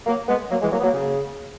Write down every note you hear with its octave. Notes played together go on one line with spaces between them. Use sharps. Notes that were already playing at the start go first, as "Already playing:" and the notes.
F#3 A#3
G#3 B3
F#3 A#3
E3 G#3
F#3 A#3
B3
F#3 A#3
C#3